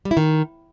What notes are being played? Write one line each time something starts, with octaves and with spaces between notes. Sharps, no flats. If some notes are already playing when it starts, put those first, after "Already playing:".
G3
E4
D#3